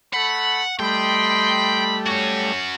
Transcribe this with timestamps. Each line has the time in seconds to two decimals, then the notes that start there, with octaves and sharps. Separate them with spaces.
0.14 A3 F#5 B5
0.79 G3 A3 D#5 G5 B5 C6
2.06 C#4 F#4 C#5